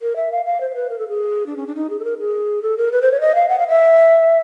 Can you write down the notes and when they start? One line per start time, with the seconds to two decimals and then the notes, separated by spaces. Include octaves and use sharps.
0.02 A#4
0.16 E5
0.32 F5
0.46 F5
0.61 C5
0.71 C5
0.75 B4
0.90 A#4
0.99 A4
1.08 G#4
1.46 D4
1.57 C#4
1.67 D4
1.75 D#4
1.90 G#4
2.00 A4
2.04 A#4
2.19 G#4
2.62 A4
2.77 A#4
2.92 B4
3.02 C5
3.11 C#5
3.21 D#5
3.35 F5
3.49 F#5
3.59 F5
3.68 E5